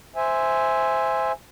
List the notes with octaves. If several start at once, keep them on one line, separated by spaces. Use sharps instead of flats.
C5 E5 G#5